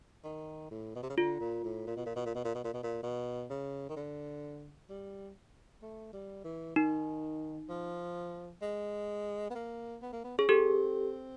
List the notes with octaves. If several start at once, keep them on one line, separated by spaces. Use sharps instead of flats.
D#3
A2
B2
C3
C#3
D3 F4
A#2
A2
A#2
B2
A#2
B2
A#2
B2
A#2
B2
A#2
B2
A#2
B2
C#3
D#3
D3
G3
A3
G3
E3
D#3 D#4
F3
G#3
B3
A#3
B3
A#3
B3
C#4 G#4
C4 G4 A4